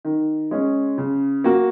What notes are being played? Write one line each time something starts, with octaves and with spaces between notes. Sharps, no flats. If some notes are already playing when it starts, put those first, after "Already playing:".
D#3
G#3 C#4
C#3
A#3 F#4